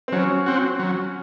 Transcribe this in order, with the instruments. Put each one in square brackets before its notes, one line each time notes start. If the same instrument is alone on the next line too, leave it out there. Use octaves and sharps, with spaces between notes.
[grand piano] C4
[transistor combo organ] F#3 [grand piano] C#4
[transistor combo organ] C4 F#4
F#3